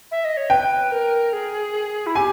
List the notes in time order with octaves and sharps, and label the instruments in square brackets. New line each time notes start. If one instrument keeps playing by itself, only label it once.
[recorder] E5
D#5
C#5
[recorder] B4 [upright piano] G5
[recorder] A#4
G#4
E4
[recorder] G4 [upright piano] G#5